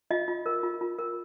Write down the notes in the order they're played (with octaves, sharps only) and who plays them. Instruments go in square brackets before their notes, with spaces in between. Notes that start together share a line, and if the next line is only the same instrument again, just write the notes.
[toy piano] F4 D#5
F4
A#4
F4
F4
A#4